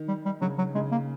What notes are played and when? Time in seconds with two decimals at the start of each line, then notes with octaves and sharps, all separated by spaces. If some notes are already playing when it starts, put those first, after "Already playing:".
Already playing: D#3
0.08 G3
0.25 G3
0.41 C#3 F#3
0.58 F#3
0.75 C#3 G#3
0.92 A#3